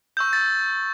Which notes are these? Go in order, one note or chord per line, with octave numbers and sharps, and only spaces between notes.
C#6 E6 G6
A6